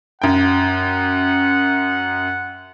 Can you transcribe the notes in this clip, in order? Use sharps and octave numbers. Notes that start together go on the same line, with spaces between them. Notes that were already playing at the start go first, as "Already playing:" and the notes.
F#2 F#5 G5